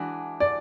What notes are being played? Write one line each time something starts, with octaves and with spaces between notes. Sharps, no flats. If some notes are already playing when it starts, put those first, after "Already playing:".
Already playing: E3 G#3 D4 F#4
D5